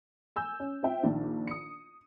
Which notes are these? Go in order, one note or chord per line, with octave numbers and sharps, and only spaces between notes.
G#5 E6 G6
C#4
C4 F4 E5 G5
A#1 D#3 D4
D#6 C#7